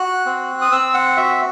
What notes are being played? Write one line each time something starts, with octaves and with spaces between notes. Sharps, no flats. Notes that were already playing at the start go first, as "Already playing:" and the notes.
Already playing: F#4 F#6
C4
D#6
C4 E6
F#5
F#4 E5